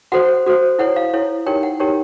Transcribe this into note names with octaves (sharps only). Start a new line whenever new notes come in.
F#4 A4 C5 F#5
F#4 A4 C5
E4 A4 C#5 F#5
F5
E4 A4 C#5
D#4 G4 A#4 C#5 G5
F#5
D#4 G4 A#4 C#5 G5